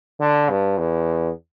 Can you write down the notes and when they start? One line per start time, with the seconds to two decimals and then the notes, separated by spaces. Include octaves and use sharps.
0.20 D3
0.49 G2
0.78 E2